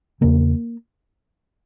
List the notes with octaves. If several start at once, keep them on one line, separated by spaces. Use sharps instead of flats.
E2 C#3 A#3